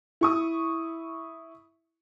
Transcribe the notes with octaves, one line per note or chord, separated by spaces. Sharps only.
E4 C#6 D#6